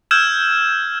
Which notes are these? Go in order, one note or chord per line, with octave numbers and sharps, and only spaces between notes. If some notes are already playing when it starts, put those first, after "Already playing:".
E6 F6 G6 G#6 E7